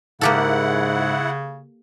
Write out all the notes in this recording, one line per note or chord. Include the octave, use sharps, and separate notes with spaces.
G#2 C#3 A#3 E4 G4 A4 F#5